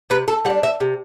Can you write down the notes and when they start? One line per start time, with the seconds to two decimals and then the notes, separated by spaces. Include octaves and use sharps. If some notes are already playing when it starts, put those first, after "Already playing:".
0.10 C3 B4
0.28 A4
0.45 G3 F#5
0.50 D4
0.63 E5
0.80 C3